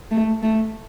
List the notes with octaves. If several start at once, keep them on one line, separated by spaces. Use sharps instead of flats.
A3
A3